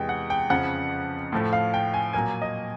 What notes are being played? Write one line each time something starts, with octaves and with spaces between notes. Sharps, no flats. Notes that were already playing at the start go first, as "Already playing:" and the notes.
Already playing: E2 C3 E3 G#3 G5
F#5
G5
F2 C#3 F3 F#5
A2 F3 A3
F5
G5
G#5
A#2 F#3 A#3 G#5
D#5